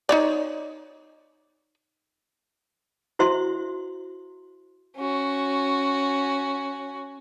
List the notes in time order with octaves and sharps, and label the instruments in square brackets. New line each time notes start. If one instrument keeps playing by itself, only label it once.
[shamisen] D#4 C#5 D5
[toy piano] E4 F#4 C5 E5 C6
[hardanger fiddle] C#4 F#4